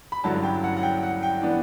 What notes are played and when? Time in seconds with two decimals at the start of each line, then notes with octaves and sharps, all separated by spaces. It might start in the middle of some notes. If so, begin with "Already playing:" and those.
0.12 B5
0.24 G2 D3 F#3 C#4 E4 A5
0.43 G5
0.64 F#5
0.77 F#5
0.83 G5
1.03 F#5
1.23 G5
1.42 E3 B3 D4